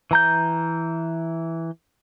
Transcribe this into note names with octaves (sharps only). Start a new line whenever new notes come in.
E3 A#5 G6